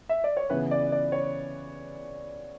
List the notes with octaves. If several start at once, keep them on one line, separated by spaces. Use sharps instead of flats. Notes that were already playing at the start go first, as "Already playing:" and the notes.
E5
D5
C#5
C#3 E3 B3 B4
D5
D5
C#5